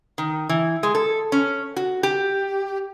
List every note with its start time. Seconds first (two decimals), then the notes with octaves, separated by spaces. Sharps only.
0.18 D#3
0.49 E3
0.83 G#3
0.95 A4
1.32 C#4
1.76 F#4
2.03 G4